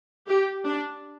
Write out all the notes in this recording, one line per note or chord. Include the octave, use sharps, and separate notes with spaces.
G4
D4